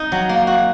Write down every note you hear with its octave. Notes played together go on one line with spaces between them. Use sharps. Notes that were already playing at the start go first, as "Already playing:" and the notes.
Already playing: D#4
F#3
A#3
F#4